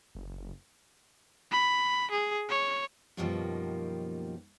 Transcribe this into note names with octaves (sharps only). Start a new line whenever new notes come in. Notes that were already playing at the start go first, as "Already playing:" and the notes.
F#1
B5
G#4
C#5
F#2 B2 D#3 F3 G3 A#3